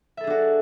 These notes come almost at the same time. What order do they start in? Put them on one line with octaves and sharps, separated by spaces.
E5 A4 G#4 D4 F#4